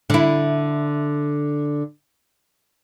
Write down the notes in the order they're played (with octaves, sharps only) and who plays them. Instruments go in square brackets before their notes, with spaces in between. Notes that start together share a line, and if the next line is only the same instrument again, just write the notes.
[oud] D3 E4